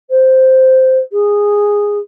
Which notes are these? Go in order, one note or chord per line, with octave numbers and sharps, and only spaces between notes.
C5
G#4